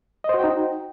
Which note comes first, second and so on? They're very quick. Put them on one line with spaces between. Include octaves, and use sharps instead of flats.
D#5 C5 F#4 G5 D#4